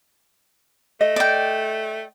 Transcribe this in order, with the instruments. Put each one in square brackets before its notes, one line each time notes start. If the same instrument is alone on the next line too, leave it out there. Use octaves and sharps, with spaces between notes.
[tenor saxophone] A3 [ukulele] D#5
[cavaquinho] D5 G5